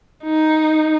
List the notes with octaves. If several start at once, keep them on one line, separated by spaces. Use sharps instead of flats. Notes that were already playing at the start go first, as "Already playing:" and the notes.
D#4